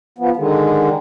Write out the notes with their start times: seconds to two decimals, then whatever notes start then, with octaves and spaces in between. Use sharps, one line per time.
0.18 F3 B3
0.37 D3 D#3 G#3